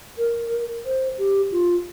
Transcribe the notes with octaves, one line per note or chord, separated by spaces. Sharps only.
A#4
C5
G4
F4